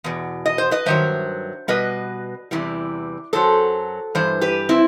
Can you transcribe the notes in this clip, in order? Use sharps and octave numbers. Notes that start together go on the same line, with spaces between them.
E2 B2
D#5
C5
B4 D#5
G2 D#3 F#3 C5 E5
B2 G3 B4 D#5
E2 C3 E3 G3
F#2 F#3 A4 C5
G2 E3 C5
G4 B4
C4 E4